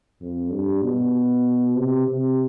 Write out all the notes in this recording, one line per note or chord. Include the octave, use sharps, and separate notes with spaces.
F2
G2
B2
C3
C3